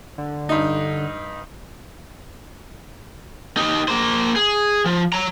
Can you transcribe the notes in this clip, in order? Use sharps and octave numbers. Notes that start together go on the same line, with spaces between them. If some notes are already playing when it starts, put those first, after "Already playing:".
D3
G2 D#4
D#4 G4
A#3 C5
G#4
F3
C#5 A#5